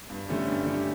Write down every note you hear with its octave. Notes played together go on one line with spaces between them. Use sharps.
G2
D3 A3 C#4 G4
G2
D3 A3 C#4 G4